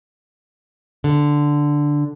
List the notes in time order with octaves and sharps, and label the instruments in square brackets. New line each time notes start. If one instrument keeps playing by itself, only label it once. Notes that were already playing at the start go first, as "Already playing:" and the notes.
[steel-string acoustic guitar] D3